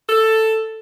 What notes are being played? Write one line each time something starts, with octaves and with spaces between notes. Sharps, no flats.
A4